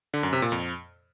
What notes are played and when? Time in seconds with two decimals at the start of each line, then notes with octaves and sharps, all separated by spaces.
0.14 D3
0.23 F#2
0.33 C3
0.42 A#2
0.52 F2